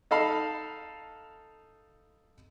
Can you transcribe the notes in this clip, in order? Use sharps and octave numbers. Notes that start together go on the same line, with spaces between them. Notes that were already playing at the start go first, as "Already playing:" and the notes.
D#4 A4 F5 B5